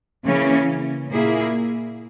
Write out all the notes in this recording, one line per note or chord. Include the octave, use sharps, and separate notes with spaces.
C#3 E3 A#3 C#4
A#2 A#3 E4 G#4